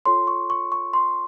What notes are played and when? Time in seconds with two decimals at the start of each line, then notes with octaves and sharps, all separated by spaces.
0.06 F4 A4 C#5 C6
0.27 C#6
0.50 C#6
0.72 C#6
0.93 C6